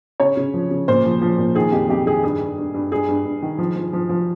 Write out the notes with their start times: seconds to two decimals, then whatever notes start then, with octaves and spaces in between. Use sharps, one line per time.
0.20 C#3 C#5
0.37 C#3
0.54 F3
0.71 C#3
0.88 A#2 C5
1.05 F3
1.21 F3
1.38 A#2
1.55 D#3 G#4
1.72 F2 G4
1.89 F2 G4
2.06 D#3 G#4
2.23 G2 G#4
2.41 G2
2.58 G2
2.74 G2
2.92 G2 G#4
3.08 G2
3.25 G2
3.42 D#3
3.58 F3
3.76 F3
3.93 F3
4.09 F3